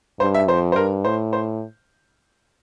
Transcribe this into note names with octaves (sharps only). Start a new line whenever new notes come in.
G2 C5
E5
F2 C5
C5
G2 A#4
A2 C5
C5